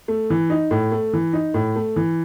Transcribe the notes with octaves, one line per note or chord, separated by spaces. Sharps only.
A3
E3
D#4
A2
A3
E3
D#4
A2
A3
E3